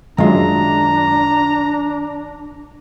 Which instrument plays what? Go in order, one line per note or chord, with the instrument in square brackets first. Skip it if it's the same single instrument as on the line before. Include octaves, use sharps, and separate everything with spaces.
[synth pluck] F#2 G#3 [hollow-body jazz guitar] D#3 F4 E5 [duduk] D4 [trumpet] A#5